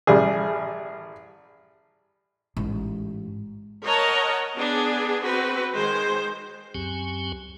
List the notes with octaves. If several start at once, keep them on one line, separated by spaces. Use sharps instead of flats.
A1 G3 G#4
A1 G#2
A#4 C#5 D#5 F#5 A5 A#5
B3 D4 G#4
C4 F#4 B4
D#3 G#3 C5
C#2 F#2 F#3 C4 G4 G#5